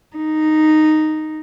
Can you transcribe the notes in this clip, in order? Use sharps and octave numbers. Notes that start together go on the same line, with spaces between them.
D#4